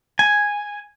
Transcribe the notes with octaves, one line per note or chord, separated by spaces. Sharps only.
G#5